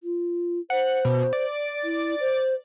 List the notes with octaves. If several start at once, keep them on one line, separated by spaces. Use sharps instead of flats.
F4
C5 F#5
B2
D5
E4
C5